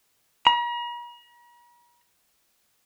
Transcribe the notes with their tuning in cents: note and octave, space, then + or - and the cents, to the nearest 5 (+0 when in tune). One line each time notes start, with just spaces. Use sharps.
A#5 +45